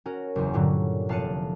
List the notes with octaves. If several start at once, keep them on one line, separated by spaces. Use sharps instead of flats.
C#4 F#4 A#4
F#1 E2
G2 A#2 D3 F#3
F1 F5 A5 F#6 C#7 D#7